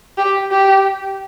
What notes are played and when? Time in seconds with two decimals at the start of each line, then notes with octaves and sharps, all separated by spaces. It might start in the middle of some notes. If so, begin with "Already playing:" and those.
0.18 G4
0.51 G4